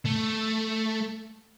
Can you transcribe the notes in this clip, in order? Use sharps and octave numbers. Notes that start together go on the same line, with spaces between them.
A3